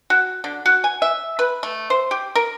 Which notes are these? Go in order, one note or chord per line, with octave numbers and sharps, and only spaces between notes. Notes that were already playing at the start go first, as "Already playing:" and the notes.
F#4
D3
F#4
G#5
E5
B4
A3
C5
G4
A#4